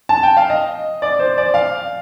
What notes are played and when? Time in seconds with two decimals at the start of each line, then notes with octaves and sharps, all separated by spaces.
0.09 A5
0.23 G5
0.37 F5
0.50 D#5
1.02 D5
1.19 C5
1.38 D5
1.54 F5